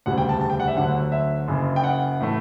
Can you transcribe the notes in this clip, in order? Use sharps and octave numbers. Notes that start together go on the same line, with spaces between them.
E1 D2 C#3 G3 F#5
G5
A5
A5
G5
F#5
E5
D2 D3 F#3 F#5
E5
F#1 F#2 C#3
G5
F#5
A2 E3 A3